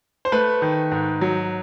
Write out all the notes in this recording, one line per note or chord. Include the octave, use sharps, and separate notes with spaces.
C5
A3 B4
D#3
G#2
F#3